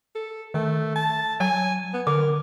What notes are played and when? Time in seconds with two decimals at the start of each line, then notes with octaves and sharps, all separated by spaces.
0.15 A4
0.54 D#3 A3
0.96 A5
1.40 F#3 G#5
1.93 B3
2.07 D3 A#4 D6